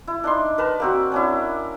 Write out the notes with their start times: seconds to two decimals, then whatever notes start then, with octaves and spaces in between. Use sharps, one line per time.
0.07 E4
0.24 D4 D#4 C6
0.58 A#4 B4 A5
0.80 A#3 C4 F#4
1.12 C#4 D4 E4